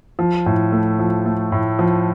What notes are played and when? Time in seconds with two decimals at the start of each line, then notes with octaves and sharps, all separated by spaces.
0.19 F3
0.46 A2
0.72 A3
0.99 F3
1.26 A3
1.52 A2
1.79 F3